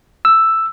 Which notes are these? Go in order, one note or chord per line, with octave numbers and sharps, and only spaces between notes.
E6